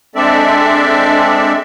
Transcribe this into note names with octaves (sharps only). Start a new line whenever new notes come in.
G#3 C4 D4 A4 D5 E5